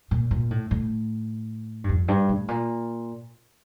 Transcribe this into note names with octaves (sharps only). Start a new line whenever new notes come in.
A#2
A#2
A2
A2
G2
F2
G2
A2
A#2